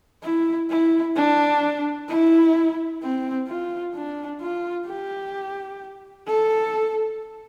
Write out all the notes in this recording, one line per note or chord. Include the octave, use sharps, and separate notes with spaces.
E4
E4
D4
E4
C4
F4
D4
F4
G4
A4